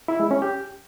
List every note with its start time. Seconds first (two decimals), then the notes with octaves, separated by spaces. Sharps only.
0.08 E4
0.20 G#3
0.31 C#4
0.42 G4